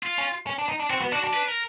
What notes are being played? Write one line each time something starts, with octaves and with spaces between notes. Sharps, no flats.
F4
C#4
C#4
D4
D#4
D4
C4 F#4
B3
D4 F#4
D4
B4
A#4